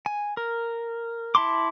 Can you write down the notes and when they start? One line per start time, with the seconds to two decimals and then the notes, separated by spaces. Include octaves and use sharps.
0.06 G#5
0.37 A#4
1.35 E4 A5 C6 D6